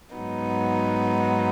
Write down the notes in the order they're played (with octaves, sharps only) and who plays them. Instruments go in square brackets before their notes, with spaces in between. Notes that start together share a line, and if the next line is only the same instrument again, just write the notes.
[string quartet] G#2 F#3 B3 D#4